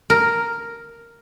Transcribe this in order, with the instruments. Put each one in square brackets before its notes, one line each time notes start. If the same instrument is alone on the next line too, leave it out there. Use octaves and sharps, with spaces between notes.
[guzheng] A#4